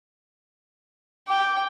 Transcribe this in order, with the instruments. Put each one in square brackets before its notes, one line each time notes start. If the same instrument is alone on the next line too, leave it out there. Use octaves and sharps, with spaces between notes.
[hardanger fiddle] G5 [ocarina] D6